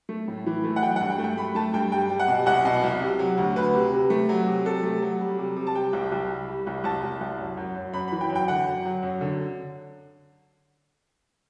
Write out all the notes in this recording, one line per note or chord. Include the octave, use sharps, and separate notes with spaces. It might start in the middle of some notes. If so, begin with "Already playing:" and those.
A3
A2
E3
A3
F#5
F#3 G5
F#5
G2
G5
A3
G5
A3 B5
A3 A5
G2 G5
G3 G5
G3
F#5
B2
C2 F#5
B2
C2
C3
F#3
D2
D2 B4
C3
C3
A3
F#3
C3
C3 A4
A3
F#3
G3
C3
C3
A5
G3 G5
C2
C2
G3
G3
C2
C2 A5
C2
C2
F#2
F#2
F#2
F#2 B5
B5
E3
G5
F#2
G5
D3 F#5
F#2
F#3
F#2
D3